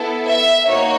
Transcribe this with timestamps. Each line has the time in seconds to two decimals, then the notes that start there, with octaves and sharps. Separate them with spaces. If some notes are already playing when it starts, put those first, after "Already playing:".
Already playing: B3 E4 A4
0.25 E5
0.67 A#3 D#4 F#4 C#5